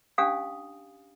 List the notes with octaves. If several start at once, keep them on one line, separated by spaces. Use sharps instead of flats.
C#4 D4 G4 F5 G#5 D#6